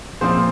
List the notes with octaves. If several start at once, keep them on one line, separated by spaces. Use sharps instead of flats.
A#2 F3 C4 C5